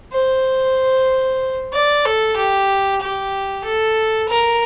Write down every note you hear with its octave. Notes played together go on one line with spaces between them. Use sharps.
C5
D5
A4
G4
G4
A4
A#4